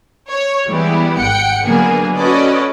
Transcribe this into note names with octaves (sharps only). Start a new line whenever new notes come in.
C#5
E3 G3 G#3 B3 E4 G4
G#1 F#5 G5 C#7
D3 F#3 A#3 B3 G#4
C#4 F#4 A4 B4 D5 D#5